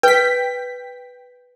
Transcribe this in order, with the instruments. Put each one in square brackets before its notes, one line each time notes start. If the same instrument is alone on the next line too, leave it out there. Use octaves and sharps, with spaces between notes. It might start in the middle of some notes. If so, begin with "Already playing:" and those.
[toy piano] B4 [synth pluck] G5 B6